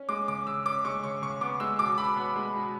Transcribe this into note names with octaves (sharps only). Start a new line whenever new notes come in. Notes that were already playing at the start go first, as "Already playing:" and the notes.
Already playing: C#4
G#3 D6
C#3 D6
C#3 E6
C#4 D6
G#3 C#6
C#3 C#6
C#3 C#6
B3 D6
G#3 E6
B2 D6
B2 B5
B3
G#3
B2